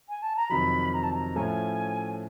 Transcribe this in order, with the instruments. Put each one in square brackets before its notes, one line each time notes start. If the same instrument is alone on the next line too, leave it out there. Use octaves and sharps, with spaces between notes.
[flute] G#5
A5
A#5
[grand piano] F2 C3 D#3 F#3 [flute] B5
[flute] A#5
A5
A#5
[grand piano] A2 F3 A3 C#4 [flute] G#5